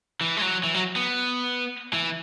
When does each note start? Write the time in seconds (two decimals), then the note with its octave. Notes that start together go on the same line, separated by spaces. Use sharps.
0.21 E3
0.37 G#3
0.42 F#3
0.64 E3
0.74 F#3
0.96 B3
1.93 E3